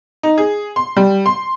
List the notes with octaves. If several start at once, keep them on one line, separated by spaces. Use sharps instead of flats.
D#4
G#4
C6
G3
C6